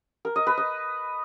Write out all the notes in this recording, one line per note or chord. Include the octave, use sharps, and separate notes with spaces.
A#4
D#5
B4
D#5